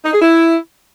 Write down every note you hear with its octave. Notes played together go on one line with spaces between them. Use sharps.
D#4
G#4
E4